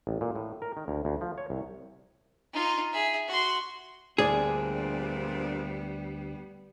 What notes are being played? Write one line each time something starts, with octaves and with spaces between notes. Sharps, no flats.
A1
A#2
A2
A#4
D#3
D2
D2
F3
C#5
C2
D#4 F4
G#4 E5
F#4 C6
D2 A#2 G3 B3 C4 D4 G#4 D5